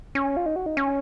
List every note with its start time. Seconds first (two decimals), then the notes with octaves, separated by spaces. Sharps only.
0.15 C#4
0.37 F4
0.46 D#4
0.56 F#4
0.66 D#4
0.77 C#4